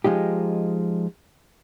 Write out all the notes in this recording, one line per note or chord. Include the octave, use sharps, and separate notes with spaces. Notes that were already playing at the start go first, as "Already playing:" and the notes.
F3 G#3 D#4 G4